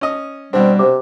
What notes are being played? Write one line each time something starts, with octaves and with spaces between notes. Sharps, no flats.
C#4 D#5
B2 G3 C4 D4
C3 C5 D6